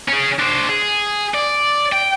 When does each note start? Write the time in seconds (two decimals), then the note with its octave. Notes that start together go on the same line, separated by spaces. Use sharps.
0.08 C#4 G#4
0.39 D4 C5
0.69 G#4
1.34 D5
1.93 G5